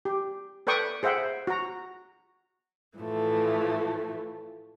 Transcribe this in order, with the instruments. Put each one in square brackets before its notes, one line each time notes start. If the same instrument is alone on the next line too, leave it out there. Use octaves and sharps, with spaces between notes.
[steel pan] G4
A4 B4 D5 G5 C#6 D#6
G#4 C5 E5 F#5 G5
F#4 A#5
[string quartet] A2 E3 F3 A3